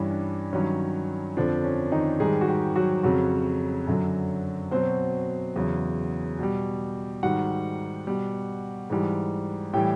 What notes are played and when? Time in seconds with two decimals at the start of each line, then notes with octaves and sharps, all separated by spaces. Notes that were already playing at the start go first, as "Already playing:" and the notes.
Already playing: G2 E3 G3 C#4
0.10 D4
0.53 G2 D#3 F#3 C#4
1.37 F2 D3 F3 D4
1.64 C#4
1.92 D#3 D#4
2.20 G#2 D#3 G3 G#3 G#4
2.41 F#4
2.48 G3 G4
2.76 F#3 F#4
3.03 F2 C#3 F#3 F#4
3.87 F#2 D3 F#3
4.71 B2 F#3 C4 C5
5.56 E2 C#3 F#3
6.39 B2 G3
7.23 G#2 D#3 G3 F#4 F#5
8.07 B2 G3
8.90 G#2 E3 G3
9.73 A2 E3 G3 G4 G5